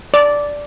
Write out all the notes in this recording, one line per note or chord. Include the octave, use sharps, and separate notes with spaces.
D5